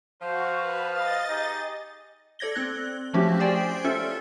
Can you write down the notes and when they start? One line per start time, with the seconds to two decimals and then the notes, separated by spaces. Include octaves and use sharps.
0.21 F3 F#4 C5
0.56 B4
0.91 D#5 F5 A6
1.28 D#4 G4 G#4
2.39 A4 D5 G#6 A#6 G7
2.56 C4 F#6
3.14 F3 A3 C#4 E4 F#4 G4
3.39 G4 G#4 C5 D5 G5 G#5
3.84 C#4 F4 A4 E5